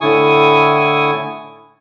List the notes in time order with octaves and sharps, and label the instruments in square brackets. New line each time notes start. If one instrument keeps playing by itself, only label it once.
[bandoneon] A2 D3 E4 G#5 C#6 D#6